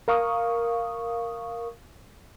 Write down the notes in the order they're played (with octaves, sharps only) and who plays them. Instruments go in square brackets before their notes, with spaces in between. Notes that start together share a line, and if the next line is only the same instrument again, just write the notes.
[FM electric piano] A#4 F5 C#6 D#6